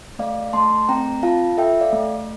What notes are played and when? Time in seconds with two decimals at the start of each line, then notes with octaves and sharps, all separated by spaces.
0.19 A3 D5 F5
0.53 A3 A5 C6
0.89 C4 G5 A#5
1.23 F4 F5 A5
1.58 A4 E5 G5
1.81 D5 F5
1.93 A3